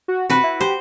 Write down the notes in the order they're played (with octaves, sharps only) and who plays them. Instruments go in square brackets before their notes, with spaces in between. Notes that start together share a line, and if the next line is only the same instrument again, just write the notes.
[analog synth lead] F#4
[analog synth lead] C3 [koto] F#4 B4
[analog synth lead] E4
[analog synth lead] G4 [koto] C5